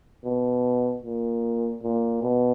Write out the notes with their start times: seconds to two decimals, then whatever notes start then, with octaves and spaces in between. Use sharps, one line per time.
0.25 B2
1.04 A#2
1.83 A#2
2.23 B2